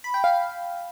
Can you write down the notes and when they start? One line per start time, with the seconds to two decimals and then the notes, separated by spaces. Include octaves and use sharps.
0.04 B5
0.14 G5
0.24 F5